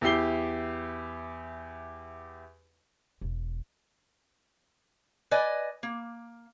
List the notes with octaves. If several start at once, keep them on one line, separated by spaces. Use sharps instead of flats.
E2 E4 G4 C7 G7
E1
B4 D5 D#5 G#5
A#3